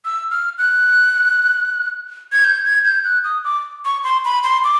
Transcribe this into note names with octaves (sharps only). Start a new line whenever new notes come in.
E6
F6
F#6
G#6
G6
G#6
G6
F#6
D#6
D6
C#6
C6
B5
C6
D6